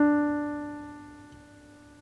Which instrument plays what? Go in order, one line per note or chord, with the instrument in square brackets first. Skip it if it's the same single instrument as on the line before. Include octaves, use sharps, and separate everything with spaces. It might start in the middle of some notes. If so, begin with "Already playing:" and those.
Already playing: [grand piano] D4